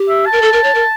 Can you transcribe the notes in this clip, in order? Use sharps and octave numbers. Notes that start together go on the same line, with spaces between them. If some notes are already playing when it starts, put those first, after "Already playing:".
Already playing: G4
E5
A5
A#4
A4
A#4
C#5
A#4